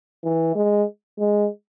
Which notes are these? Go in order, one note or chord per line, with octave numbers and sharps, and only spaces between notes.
E3
G#3
G#3